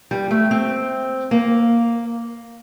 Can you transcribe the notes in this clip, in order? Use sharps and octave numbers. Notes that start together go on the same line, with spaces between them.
G3
A3
C4
A#3